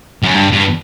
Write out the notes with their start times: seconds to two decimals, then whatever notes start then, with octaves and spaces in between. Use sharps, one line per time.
0.23 F#2
0.36 G2
0.52 G2